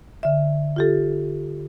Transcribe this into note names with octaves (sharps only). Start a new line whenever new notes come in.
D3 E5
F4 G4 A4